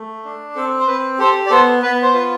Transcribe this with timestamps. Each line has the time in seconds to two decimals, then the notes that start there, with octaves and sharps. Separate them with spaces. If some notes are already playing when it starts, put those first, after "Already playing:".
Already playing: A3
0.25 D4
0.55 C4 A4
0.79 C5
0.87 C4 B4
1.19 G4 A4 C5
1.46 D5
1.50 B3 A4 C5
1.82 B3 B4
2.02 C5
2.13 F4 B4